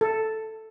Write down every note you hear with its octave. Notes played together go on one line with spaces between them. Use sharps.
A4